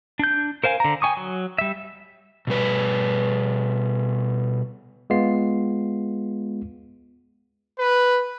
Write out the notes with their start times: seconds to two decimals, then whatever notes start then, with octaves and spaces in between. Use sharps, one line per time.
0.19 D4 G6
0.64 A#4 C5 F5 G#5
0.80 D3 A#5
1.02 G5 G#5 C#6 D#6
1.17 F#3
1.58 G3 E5
2.47 B2 G3 B4
5.10 G#3 B3 F4 C7
7.79 B4